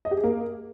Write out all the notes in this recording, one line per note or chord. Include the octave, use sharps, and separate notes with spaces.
D#5
G4
G#4
A#3